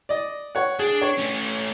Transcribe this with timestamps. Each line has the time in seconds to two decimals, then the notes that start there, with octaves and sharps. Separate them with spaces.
0.09 D5 D#5
0.55 C#5 F#5
0.79 D4 G#4
1.02 C#5
1.18 A3 C#4